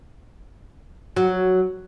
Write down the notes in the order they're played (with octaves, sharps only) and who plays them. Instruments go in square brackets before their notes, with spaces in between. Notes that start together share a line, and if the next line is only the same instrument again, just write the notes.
[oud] F#3